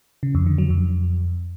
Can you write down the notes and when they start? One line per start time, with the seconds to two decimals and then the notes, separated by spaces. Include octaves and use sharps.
0.23 C#3
0.35 F2
0.47 D3
0.58 F#3
0.70 F2